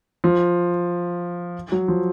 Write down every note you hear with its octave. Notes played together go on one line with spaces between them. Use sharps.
F3
F#3
F3